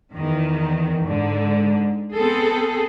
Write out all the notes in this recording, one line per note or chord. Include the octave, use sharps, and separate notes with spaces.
E2 D#3
G#2 D3
B3 C4 G#4 A4